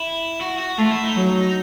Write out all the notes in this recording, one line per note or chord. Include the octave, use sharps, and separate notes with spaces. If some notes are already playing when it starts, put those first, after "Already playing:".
Already playing: E4
F#4
F#4
A3 F4
E4
D#4
F#3